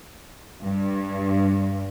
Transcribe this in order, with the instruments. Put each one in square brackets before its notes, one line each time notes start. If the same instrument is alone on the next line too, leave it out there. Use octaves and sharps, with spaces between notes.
[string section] G2